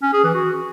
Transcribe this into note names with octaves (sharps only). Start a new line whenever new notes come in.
C#4
G#4
E3
F#4